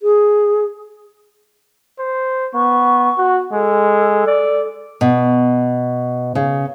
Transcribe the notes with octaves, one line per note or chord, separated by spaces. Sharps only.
G#4
C5
B3 C#6
F#4
G#3 A4
D5
B2
C#3